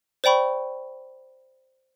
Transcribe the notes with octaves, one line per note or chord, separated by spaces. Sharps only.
C5 D5 G5 B5 C#6